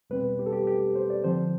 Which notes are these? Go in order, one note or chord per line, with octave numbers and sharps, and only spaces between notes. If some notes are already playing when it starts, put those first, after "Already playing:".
E2 B2 G3 C4 B4
G4
A4
G4
G4
C5
D5
D3 F3 C4 C5